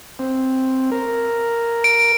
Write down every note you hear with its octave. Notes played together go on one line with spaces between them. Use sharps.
C4
A#4
D7